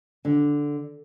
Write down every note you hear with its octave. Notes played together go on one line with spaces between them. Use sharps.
D3